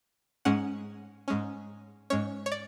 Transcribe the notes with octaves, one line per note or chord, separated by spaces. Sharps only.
G#2 G#3 C#4 F#5
G#2 G#3 C#4
G#2 G#3 C#4 C#5
C#5
D5